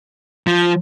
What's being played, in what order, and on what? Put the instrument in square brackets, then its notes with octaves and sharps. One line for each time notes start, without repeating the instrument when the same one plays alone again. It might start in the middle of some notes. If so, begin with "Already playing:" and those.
[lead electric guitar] F3